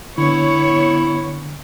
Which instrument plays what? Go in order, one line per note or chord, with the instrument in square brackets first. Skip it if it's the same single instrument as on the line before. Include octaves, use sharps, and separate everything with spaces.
[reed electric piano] D3 [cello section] B3 C#5 [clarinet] E4